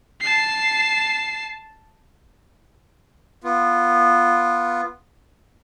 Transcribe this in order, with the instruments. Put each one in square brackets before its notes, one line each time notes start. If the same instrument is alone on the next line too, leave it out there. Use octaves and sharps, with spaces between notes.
[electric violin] A5 C7
[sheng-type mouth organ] B3 F4